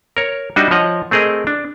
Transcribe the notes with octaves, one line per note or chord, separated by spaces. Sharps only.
A#4 C#5
G3 D4 D#4 F#4 D#5 E5
F3 C#5 D#5 F#5
A3 C4 G#4 A#4 D#5
D4